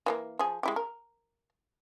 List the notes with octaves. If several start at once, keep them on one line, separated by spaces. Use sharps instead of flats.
E3 G3 A#3
F3 G#4
G#3 E4 G4
A#4